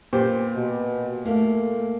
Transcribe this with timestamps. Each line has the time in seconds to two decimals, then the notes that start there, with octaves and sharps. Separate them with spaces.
0.13 A#2 G4 B4 C5
0.55 B2
1.26 A3 A#3 E4 F5